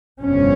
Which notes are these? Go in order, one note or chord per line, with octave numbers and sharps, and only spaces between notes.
G1 F2 C3 C#4